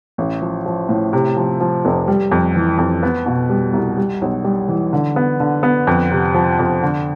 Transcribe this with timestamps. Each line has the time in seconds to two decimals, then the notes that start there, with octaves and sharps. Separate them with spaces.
0.18 A1
0.41 F3
0.66 F3
0.89 A2
1.13 C3
1.36 F3
1.61 F3
1.85 F1
2.08 G3
2.31 F2
2.55 E3
2.78 F2
3.03 B3
3.26 B2
3.50 G3
3.73 C2
3.97 G3
4.22 B1
4.44 G3
4.69 E3
4.93 D3
5.16 B3
5.40 D3
5.63 B3
5.87 F2
6.11 C3
6.34 F3
6.59 F2
6.83 D3